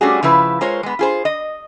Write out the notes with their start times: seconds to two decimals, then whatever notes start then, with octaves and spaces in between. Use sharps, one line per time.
0.01 G3 A3 C#4 D4 F#4 G#4
0.23 C#3 F3 E4 B4
0.61 G#3 F4 A#4 C5 C#5
0.83 G#3 B3
0.99 F4 G#4 C5
1.25 D#5